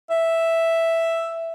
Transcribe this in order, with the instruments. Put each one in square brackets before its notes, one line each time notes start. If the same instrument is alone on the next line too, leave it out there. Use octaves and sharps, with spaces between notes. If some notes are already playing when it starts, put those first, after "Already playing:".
[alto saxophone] E5